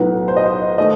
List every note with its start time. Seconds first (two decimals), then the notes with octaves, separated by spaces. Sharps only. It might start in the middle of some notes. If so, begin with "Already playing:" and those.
Already playing: B1 A2 F#3 B3 B4
0.28 C5
0.36 D#5
0.46 C5
0.78 D#3 A3 D#5